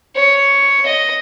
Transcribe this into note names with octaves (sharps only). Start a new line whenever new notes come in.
C#5
D#5